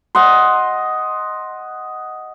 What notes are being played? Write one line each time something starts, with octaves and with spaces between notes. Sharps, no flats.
D#5 F#5 C6